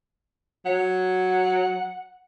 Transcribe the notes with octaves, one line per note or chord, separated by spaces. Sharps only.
F#3 F#5